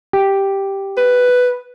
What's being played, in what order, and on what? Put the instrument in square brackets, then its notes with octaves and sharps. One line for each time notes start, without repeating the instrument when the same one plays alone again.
[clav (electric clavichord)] G4
[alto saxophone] B4